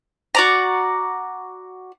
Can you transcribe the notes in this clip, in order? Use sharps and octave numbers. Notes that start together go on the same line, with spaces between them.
F#4 D5 A#5